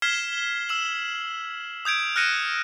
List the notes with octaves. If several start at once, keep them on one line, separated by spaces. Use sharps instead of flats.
F6 G#6 B6 C7 E7 G7
E6 E7 F#7
D#6 G6 G#6 D7
F6 F#6 A#6 C#7 D#7 E7